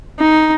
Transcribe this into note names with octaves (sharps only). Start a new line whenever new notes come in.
D#4